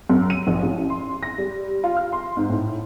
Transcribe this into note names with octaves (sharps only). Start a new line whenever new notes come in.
F#2
D#7
A#1
A1
C6
A#6
G3
F4
F6
C6
G#2
A2